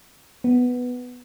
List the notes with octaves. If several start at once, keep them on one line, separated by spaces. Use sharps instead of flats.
B3